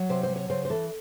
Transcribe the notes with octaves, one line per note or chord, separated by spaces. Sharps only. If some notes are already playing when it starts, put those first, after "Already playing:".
Already playing: F#3
C3 C5
C5
F#3
C#5
C#3 C5
C5
E3 A4